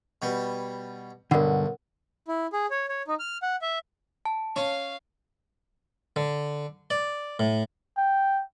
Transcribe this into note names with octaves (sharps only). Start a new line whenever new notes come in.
B2 G3
B1 G2 D3 A#4 F#5
E4
G#4
C#5
C#5
D#4
F6
F#5
E5
A5
C#4 F5
D3
D5
A2
G5